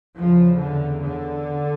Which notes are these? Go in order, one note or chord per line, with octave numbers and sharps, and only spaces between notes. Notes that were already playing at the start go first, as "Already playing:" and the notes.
E2 C#3 F3
D3
D3